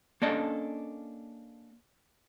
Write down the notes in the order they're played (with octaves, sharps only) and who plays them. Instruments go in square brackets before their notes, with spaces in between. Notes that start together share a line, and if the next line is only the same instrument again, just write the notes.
[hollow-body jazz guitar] A#3 C#4 D4 A4 D5 D#5